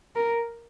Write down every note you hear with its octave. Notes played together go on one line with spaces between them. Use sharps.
A#4